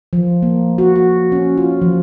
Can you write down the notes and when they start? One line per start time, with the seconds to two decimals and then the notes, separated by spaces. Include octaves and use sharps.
0.13 F3
0.42 A#3
0.78 F#4
0.96 F#4
1.32 C#4
1.57 F4
1.81 F3